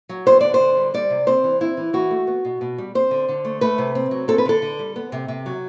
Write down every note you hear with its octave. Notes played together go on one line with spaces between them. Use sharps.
F#3
B3 C5
D3 D5
C5
D3
G3
G3 D5
C3
C4 C5
E3
C4 E4
E3
E3 F#4
A3
B3
B2
B2
G3
C4 C5
D3
D3
A3
A3 B4
C3
C4
F#3
C4 A4
B4
D3 A4
D3
G3
B3
C3
C3
F#3